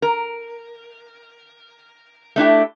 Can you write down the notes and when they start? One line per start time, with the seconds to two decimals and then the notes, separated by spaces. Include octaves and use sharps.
0.02 A#4
2.36 A3 D4 E4 G4